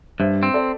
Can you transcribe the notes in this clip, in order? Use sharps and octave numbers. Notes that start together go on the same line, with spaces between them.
G2 C5 E5
C4
A4 D5